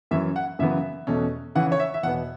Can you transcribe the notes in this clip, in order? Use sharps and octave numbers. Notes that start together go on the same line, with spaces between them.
F#2 E3 C#4 E5
F#5
F#2 C#3 E3 B3 E5
E2 B2 A3 C#4
C#3 E3 C#4 F#5
C#5
E5
E5
E2 B2 B3 F#5